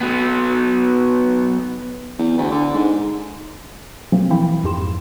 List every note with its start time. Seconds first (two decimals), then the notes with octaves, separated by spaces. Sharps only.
0.01 F#3 B3
2.19 E2
2.37 D2
2.51 D3
2.74 G#2
4.12 B2 F3 F#3 A3 A#3 C4
4.30 E3 A#3 E4 G5 B5
4.64 F2 G#2 G4 C6 E7